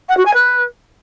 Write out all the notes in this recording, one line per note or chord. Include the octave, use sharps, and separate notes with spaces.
F#5
F#4
G#5
B4